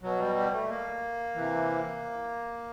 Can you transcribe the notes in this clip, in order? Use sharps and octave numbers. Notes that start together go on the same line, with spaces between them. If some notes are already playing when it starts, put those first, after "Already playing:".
B2 F#3
G3
G3
A3
A#3
C3 E3